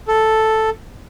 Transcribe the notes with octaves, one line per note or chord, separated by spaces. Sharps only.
A4